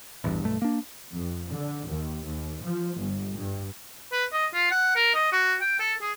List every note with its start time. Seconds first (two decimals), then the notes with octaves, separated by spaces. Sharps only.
0.24 A1 E2 G2
0.43 B1 G2 A3
0.62 A#3 D4
1.13 F2
1.51 D3
1.87 D#2
2.26 D#2
2.62 F3
2.99 G1
3.34 G2
4.12 B4
4.33 D#5
4.54 F4
4.71 F#5
4.96 A#4
5.14 D#5
5.33 F#4
5.61 G5
5.80 A4
6.02 G#4